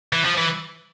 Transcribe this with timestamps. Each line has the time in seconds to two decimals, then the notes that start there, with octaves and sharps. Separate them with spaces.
0.13 E3
0.25 F3
0.38 E3